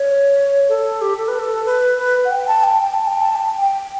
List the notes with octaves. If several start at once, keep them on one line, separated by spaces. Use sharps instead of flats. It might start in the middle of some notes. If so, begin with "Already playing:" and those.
Already playing: C#5
A4
G4
A4
B4
A4
B4
B4
F#5
G5
A5
G5
G5
A5
G5
A5
G5
G5